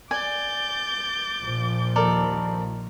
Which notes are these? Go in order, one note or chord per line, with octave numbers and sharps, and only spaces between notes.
D5 G#5 D6 G6 A6
A#1 A#2 F3
D#2 A4 A#4 D5